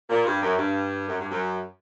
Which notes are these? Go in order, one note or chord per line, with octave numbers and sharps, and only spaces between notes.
A#2
G2
F#2
G2
F#2
G2
F#2